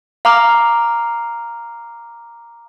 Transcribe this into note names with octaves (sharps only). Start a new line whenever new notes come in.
F5 A#5 D6 F6